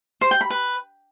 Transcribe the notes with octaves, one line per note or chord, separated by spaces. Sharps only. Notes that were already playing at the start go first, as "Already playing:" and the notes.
C5
G5
B5
B4